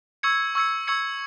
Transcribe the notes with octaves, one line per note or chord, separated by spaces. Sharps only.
C#6 E6 G#6 C#7
C#6 E6 G#6 C#7
C#6 E6 G#6 C#7